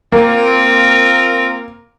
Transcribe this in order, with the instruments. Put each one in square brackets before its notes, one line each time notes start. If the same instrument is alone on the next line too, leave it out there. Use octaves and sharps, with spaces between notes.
[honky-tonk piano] A#3 [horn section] C4 F4 A#4